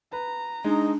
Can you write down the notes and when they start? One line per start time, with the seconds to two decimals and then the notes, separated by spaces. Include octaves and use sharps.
0.13 B4 A#5
0.64 G#3 D4 D#4